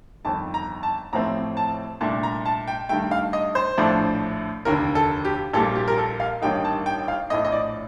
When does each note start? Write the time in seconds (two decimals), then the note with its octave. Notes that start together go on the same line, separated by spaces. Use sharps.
0.25 G1 F2 D#3 A5
0.54 A#5
0.83 A5
1.13 A1 A2 F3 A3 C4 A#5
1.57 A5
2.01 C2 A#2 A3 D4 A5
2.23 A#5
2.45 A5
2.68 G5
2.89 G2 D#3 A3 G5
3.11 F5
3.33 D#5
3.55 C5
3.77 A#1 A2 F3 A3 D4
4.65 F1 D#2 D3 A#4
4.95 A4
5.25 G4
5.53 A#1 A#2 G3 A#3 A4
5.76 G4
5.88 A#4
5.98 A4
6.20 F5
6.42 A1 G2 D#3 A#3 D#4 G5
6.65 A5
6.86 G5
7.08 F5
7.30 A#1 A2 A3 D#5
7.45 D#5
7.52 D5